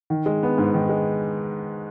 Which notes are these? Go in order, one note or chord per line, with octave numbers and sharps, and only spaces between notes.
D#3
G#3
B3
G#2
D#3
G#3